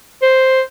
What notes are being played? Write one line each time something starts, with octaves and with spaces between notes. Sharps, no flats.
C5